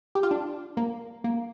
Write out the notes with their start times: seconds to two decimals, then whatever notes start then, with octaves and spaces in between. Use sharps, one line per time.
0.15 G4
0.23 F4
0.31 D4
0.77 A#3
1.24 A#3